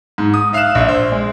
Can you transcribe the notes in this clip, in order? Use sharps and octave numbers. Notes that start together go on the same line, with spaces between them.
G#2
D#6
E5 F5 F6 F#6 E7
A#1 E5
C5
G#3